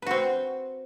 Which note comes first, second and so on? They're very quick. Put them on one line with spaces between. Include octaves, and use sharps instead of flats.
B4 F#4 C4